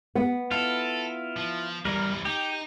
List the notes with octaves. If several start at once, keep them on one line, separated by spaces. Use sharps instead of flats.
B3
E4 F4 A4
F3
F#2 E3 G3 A#4
D#4 G4